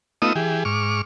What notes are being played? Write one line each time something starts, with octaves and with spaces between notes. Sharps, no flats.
A3 B3 D#4 F4 D#6 E6
E3 G4 G#4
G#2 C#6 D6 F6